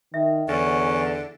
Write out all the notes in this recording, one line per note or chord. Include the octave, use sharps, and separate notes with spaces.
D#3 E5
E2 D3 C#4